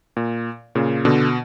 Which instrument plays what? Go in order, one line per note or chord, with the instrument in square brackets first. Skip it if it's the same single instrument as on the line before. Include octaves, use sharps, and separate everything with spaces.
[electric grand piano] A#2
A#2 C#3
B2 D3